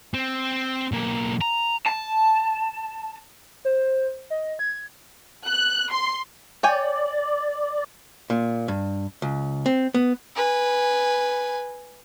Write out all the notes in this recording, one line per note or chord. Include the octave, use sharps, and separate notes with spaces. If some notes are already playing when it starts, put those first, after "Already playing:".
C4
B1 A#3
A#5
A5
C5
D#5
G#6
F#6
C6
C#5 D5 G5 G#5
A#2
G2
C#2
C4
B3
B4 G#5